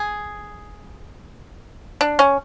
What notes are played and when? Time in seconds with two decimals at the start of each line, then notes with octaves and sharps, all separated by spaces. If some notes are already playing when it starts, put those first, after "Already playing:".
Already playing: G#4
2.01 D4
2.19 C#4